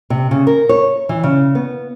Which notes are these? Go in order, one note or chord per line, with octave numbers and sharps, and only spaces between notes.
C3
C#3
A#4
C#5
E3
C#3
B3